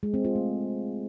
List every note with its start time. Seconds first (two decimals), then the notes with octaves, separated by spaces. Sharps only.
0.03 G#3
0.14 C4
0.25 F4
0.35 A3